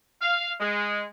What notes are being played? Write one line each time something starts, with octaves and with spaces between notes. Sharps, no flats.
F5
G#3